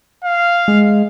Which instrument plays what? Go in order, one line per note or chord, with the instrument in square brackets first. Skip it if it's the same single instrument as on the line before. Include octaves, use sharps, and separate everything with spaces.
[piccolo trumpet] F5
[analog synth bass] G#3